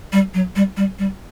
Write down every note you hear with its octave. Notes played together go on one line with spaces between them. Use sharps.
G3
F#3
G3
G3
G3